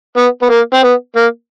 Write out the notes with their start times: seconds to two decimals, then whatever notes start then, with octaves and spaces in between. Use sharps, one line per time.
0.16 B3
0.42 B3
0.49 A#3
0.73 C4
0.83 B3
1.16 A#3